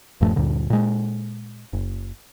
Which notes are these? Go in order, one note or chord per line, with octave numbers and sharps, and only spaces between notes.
D#1 G2 F3 A3
D2 G2 A#2 D3
A#2 G#3
F#1